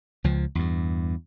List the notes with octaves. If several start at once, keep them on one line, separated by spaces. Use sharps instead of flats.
C#2 F3
E2 G2